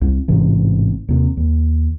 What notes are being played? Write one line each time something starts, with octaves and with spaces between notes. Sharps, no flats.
C2
A1 G#2 C3 E3
D#2 C3
D#2